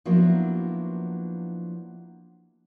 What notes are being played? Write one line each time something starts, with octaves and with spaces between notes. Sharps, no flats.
F3 F#3 A#3 B3 D4 E4